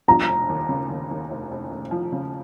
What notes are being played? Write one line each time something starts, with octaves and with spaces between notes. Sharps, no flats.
F3 A#5
F1
D#2
C#3
D#2
D#2
F1
F1
F1
F3
C#3